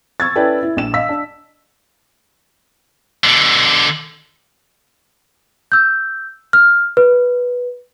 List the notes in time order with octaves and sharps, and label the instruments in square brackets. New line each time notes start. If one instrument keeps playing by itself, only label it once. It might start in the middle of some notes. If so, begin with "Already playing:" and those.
[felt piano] C#6 E6 G#6 A6
C#4 E4 A4 B4 D5 G5
E4
A#1 E7
D#5 F5 E6 B6
D4
[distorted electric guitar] B2 D3
[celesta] E6 G6
F6
B4